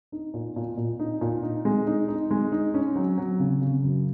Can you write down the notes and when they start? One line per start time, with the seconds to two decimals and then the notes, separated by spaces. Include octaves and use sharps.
0.12 D#4
0.34 A#2
0.56 A#2
0.77 A#2
0.99 D#4
1.21 A#2
1.43 D#4
1.65 G#3
1.87 D#4
2.08 D#4
2.31 G#3
2.52 D#4
2.74 C#4
2.96 F#3
3.17 F#3
3.40 C#3
3.61 C#3
3.83 F#2